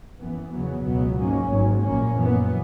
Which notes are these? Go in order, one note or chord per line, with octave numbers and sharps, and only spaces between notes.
F#2 E3 B3
E2 C#3 F#3 B3
C#2 B2 F#3 B3
G#2 F#3 A#3 C#4
G#1 G#2 F#3
A#1 A#2 A#3 C#4
F#2 E3 B3